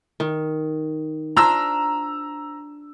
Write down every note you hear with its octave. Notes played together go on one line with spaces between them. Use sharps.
D#3
D4 F4 C5 A#5 E6